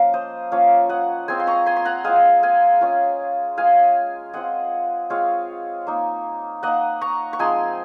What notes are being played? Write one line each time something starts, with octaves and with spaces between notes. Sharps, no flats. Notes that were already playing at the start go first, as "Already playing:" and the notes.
Already playing: F3 A#3 C#4 F4 F5
C5 D#5
F3 A#3 C#4 F4 C#5 F5
D#5 F#5
G#3 C4 F4 G#5 C6
C6
A#5 C#6
G#5 C6
C6
F#5 A#5
G#3 C4 F4 F5 G#5
F5 G#5
G#3 C#4 F4
G#3 C#4 F4 F5 G#5
G#3 C4 F4 D#5 F#5
G#3 C4 F4 C#5 F5
A#3 D#4
A#3 D#4 D#5 F#5
A#5 C#6
C#6
F3 G#3 C4 D#4 G#5 C6